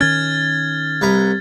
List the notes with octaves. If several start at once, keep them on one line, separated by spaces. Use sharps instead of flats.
D#3 C#4 F6 G#6 A6
C2 B4 A#5